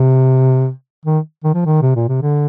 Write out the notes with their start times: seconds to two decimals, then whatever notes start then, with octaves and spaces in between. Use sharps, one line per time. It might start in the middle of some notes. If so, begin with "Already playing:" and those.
Already playing: C3
1.05 D#3
1.44 D#3
1.54 F3
1.65 D#3
1.82 C3
1.96 A#2
2.08 C3
2.22 D3